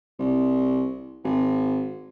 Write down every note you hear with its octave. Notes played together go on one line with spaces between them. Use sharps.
C2
G#1